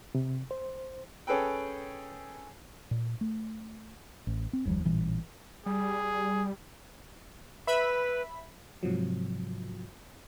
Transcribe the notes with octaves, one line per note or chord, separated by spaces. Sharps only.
C3
C5
C#4 G#4 A4 B4 G5
A#2
A3
A1
C4
F#1 D#2 F3 G3
A1 A#2 E3 G3
G3 G#4
B4 E5 B5 B6
G#2 C3 F3 F#3